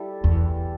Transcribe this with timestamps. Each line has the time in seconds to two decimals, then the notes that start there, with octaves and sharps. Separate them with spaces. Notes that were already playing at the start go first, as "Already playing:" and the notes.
Already playing: G3 E4 A4
0.24 E2